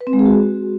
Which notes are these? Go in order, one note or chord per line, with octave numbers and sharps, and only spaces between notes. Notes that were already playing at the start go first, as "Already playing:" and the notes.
B4
C4
G#3
G#4
F#4